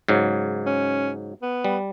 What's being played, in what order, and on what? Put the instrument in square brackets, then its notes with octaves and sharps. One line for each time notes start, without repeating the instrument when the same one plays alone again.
[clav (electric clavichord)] G#2 C#3 F#3
[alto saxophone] C#4
B3
[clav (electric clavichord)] G3